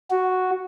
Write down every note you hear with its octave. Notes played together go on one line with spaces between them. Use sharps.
F#4